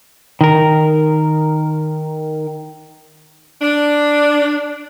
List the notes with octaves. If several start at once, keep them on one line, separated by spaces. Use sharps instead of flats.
D#3 A#4
D4